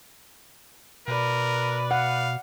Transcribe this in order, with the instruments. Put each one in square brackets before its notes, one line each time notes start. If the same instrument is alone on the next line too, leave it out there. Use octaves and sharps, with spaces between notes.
[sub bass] B2 [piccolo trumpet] A#4 [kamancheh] B4 D5
[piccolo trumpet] F5 [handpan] F#5